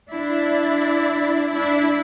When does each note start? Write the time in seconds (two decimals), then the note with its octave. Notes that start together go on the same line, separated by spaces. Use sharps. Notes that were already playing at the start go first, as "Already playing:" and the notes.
0.11 D4 E4
1.52 D4 E4